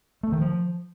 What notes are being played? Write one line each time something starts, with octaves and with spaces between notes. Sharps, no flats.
A3
D#3
F3